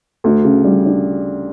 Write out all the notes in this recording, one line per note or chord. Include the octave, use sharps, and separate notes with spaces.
D2
C#3
G3
D4